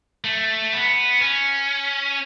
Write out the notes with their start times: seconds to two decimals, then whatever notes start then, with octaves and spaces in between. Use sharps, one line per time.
0.24 A3
0.72 B3
1.22 C#4